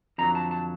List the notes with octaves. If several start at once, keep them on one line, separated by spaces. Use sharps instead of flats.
F2 D3 F#3 A#5
A5
A5